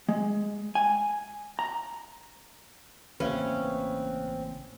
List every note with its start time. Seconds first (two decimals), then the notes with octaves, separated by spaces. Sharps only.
0.09 G#3
0.75 G#5
1.59 A#5
3.20 A1 C#3 A#3 C4 C#4 B4 E5 F5